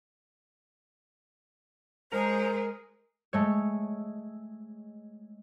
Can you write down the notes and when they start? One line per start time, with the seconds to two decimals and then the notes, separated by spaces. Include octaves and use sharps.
2.12 G#3 G#4 A#4 C5 A#5
3.33 G#3 A3 C#5